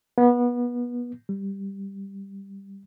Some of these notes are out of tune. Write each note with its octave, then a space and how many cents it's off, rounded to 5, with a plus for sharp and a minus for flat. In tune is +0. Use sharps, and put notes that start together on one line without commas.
B3 -25
G3 +5